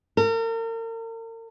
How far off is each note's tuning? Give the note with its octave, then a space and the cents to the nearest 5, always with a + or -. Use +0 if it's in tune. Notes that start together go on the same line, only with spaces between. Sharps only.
A#4 -40